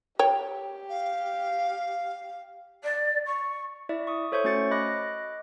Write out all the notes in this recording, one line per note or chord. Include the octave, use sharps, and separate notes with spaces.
G4 C#5 G5
F5
D5
C#6
E4 D5 E5
C#6 D#6
A4 C5 C#5 E5 C#6 G6
A3 C#4 F#4 C#6 A6 C#7
D#5 B5 D6 F#6 A#6